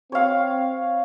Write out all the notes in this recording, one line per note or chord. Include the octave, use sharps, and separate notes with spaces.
C4 C#5 F5